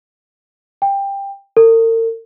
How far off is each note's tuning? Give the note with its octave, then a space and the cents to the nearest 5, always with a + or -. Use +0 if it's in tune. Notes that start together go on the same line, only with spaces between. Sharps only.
G5 +15
A#4 -45